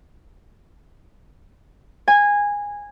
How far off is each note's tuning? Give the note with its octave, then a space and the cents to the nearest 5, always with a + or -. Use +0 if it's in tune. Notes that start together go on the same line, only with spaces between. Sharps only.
G#5 -15